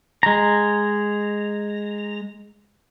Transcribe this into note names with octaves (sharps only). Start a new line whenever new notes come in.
G#3 A#5